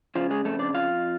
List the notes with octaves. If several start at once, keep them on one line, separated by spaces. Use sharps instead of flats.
C#3 F3 F4
G#3 G#4
F2 A3 A4
D4 D5
F2 F4 F5